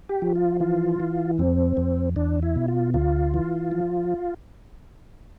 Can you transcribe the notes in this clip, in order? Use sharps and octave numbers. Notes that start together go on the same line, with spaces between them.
G4
F3
F4
E3 F4
E3
F2 C4
F2
E2 D4
E4
B2
F4
D2 F4
E3
F3